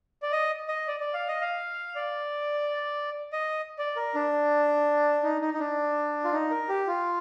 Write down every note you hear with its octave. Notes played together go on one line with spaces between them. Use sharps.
D5
D#5
D#5
D5
D5
F5
D#5
F5
D5
D#5
D5
A#4
D4
D#4
D#4
D#4
D4
F4
D#4
A#4
G4
F4